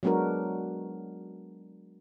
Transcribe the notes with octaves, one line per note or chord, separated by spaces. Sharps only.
F#3 G#3 B3 D4 F#4 A#4